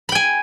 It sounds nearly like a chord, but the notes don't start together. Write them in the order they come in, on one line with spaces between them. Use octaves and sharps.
B5 G5 G#5